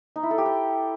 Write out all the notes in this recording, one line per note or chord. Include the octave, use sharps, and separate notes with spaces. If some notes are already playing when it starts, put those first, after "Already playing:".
D#4
E4
A4
G4
G5